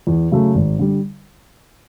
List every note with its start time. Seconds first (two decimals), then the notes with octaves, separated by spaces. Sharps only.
0.07 E2
0.32 C#3 F#3 A3
0.55 G#1
0.79 D3 G3